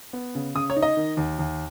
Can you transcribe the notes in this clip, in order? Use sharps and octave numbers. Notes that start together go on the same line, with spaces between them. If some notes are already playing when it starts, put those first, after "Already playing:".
B3
C#3
C#3 D#6
C#5
D#4
D#5
D#3
D#2
D#2